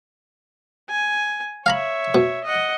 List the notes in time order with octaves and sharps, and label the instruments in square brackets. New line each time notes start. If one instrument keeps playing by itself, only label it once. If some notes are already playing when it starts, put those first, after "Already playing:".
[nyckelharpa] G#5
[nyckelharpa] C#5 E5 [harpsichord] F5 A#5 B5
[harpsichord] B2
[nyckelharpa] D#5 F#5